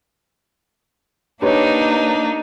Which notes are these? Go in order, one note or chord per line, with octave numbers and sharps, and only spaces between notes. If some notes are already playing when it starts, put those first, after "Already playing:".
A#3 D4 D#4 G4 B4 C#5